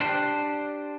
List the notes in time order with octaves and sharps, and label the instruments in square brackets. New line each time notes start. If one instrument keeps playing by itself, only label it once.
[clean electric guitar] D4 G4 C5